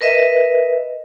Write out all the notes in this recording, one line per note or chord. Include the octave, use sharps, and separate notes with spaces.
A#4 B4 D#5 E5